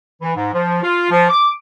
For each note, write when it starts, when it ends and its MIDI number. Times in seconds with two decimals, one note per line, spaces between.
0.21 0.32 52
0.35 0.51 44
0.53 0.79 53
0.82 1.09 65
1.10 1.25 53
1.30 1.47 86